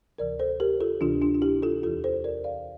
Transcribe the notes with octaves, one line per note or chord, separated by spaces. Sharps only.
D2 C3 E3 A#4 D5
A4 C5
G4 A#4
F4 A4
D2 C3 E3 D4 F4
D4 F4
F4
E4 G4
F4 A4
E2 E3 F4 A4
A4 C5
A#4 D5
D5 F5